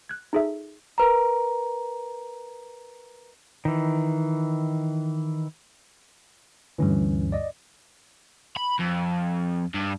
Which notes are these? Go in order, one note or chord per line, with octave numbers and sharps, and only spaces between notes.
F#6 G#6
D#4 F4 G#4 A4 E5
A#4 B4 A#5
D#3 E3
D2 G2 E3 C#4
D5 D#5
B5
F2
G2